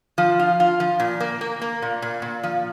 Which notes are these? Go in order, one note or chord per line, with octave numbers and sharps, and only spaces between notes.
F3
F4
F4
F3
A#2
A#3
A#3
A#3
A#2
A#2
A#2
F3